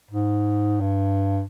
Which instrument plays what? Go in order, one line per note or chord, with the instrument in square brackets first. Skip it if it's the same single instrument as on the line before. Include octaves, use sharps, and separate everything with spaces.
[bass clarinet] G#2
G2